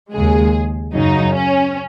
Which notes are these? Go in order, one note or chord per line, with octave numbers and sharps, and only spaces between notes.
D#2 C#3 G#3 G#4
F#2 C#3 F#3 D#4
C#4